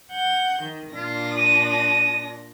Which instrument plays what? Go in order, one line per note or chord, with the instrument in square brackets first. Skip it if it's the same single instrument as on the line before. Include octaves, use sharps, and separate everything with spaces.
[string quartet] F#5 G6
D#3
[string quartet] A#2 D4 A#6 [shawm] F4
[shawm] D#6
D#6